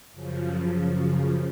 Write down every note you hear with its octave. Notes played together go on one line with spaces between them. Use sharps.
F#2 C#3 F3